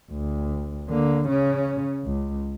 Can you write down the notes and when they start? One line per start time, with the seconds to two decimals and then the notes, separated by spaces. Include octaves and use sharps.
0.12 D2
0.89 D3 A#3
1.29 C#3 C#4
2.05 C#2